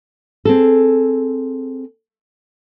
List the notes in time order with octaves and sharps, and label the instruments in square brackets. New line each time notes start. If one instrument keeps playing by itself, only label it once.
[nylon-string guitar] C4 G#4 A4